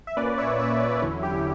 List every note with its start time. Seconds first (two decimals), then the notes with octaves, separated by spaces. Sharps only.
0.07 E5
0.17 A#2 A#3 C#4 B4 D5
0.38 C#5 E5
0.59 C#5 E5
0.80 B4 D5
1.02 E2 D3 F#3 C#4 E4
1.23 G4